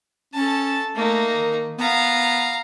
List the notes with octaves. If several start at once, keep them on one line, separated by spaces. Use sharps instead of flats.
C#4 A4 A5
A3 A#3 D#4
D#3
B3 F5 A#5